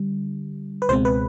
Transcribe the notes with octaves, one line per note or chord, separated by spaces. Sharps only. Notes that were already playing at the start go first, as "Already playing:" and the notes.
Already playing: D3 G3
B4
C#2 B2 G#3 C4 C5
B4